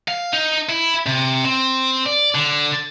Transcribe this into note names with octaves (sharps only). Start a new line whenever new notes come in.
F5
D#4
E4
C3
C4
D5
D3